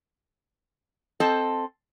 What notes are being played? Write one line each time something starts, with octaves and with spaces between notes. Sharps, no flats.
C4 A4 D#5 A5